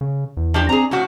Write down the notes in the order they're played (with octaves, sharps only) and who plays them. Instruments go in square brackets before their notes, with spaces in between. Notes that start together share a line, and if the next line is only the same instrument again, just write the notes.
[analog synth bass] C#3
E2
[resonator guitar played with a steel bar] F3 D4 G4
[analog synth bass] C4 [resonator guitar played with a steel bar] G#4 A#5
[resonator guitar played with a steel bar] A2 F3 F#4 [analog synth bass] C#4